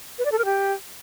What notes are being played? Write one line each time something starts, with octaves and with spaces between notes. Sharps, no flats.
B4
D5
A4
A#4
G4